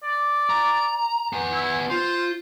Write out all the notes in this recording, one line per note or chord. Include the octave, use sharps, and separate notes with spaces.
D5
A#5
B3 G#5
E4
F4 C5